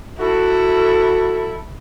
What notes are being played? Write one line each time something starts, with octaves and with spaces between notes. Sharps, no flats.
E4 F#4 A4